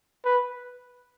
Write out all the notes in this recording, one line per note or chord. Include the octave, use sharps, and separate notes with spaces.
B4